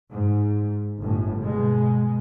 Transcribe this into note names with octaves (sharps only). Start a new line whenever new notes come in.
G#2
G1 A2
B2 G#3